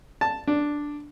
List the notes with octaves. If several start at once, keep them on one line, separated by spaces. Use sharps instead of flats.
A5
D4